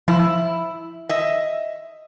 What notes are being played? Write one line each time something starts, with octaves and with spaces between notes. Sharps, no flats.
F3 E4
D#5 E5